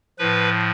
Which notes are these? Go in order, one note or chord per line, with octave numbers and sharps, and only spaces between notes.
A2 F3 B4